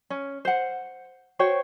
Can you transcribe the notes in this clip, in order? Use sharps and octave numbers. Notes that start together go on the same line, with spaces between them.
C#4
C5 F#5
F#4 C5 C#5 G5